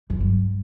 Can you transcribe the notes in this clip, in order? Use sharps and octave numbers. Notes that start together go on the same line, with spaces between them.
F#2
G2